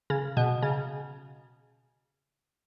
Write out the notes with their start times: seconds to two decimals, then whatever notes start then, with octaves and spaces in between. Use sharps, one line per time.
0.10 C#3
0.37 B2
0.62 C#3